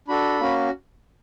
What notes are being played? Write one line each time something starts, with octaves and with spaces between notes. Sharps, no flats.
D4 F#4 A4 B5
A#3 C#4 F#4